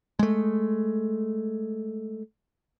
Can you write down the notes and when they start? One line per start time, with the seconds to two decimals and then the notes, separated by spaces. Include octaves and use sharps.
0.19 G#3 A3